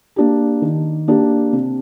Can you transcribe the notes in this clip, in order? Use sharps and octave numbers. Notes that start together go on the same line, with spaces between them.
A#3 D4 G4
D#3
A#3 D4 G4
C3